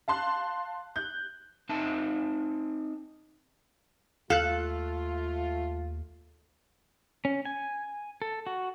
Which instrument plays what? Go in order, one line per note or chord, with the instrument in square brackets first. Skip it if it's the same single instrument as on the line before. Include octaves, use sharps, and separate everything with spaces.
[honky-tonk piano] F5 A5 C6 F#6
F#6 G6
[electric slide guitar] C4 D#4 E5 A5
[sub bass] D#2 [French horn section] A3 F4 [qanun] A4 [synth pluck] F5 F#6
[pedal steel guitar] C#4
G#5
A4
F#4